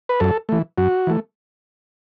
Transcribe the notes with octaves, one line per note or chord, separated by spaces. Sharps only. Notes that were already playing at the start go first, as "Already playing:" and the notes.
B4
F#2 A4
E3 A3
F#2 F#4
E3 A3